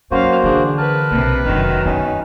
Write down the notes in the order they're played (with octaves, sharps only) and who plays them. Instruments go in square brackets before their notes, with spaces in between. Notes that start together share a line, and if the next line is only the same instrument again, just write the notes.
[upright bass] F#3 [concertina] A#3 F#4 C5 [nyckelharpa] C#4 F5
[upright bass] D3 E3 [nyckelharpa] D4 G#4
[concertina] A#4 A5 [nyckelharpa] B4
[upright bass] B1 [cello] C3
[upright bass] F1 [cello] F#2 D#3 [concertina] A#4 A#5
[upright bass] B3 [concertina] C#4 D#4